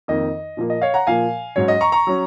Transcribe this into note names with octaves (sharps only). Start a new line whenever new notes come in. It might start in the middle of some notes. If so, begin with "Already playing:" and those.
F2 D#3 A#3 D#4 D#5
A#2 F3 A#3
D#5
C#5 F5
F#5 A#5
A#2 F3 A#3 F5 G#5
G#2 F#3 C#4 C#5
D#5
A#5 C#6
A#5 C#6
F#3 C#4